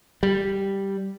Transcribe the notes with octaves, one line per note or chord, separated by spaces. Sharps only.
G3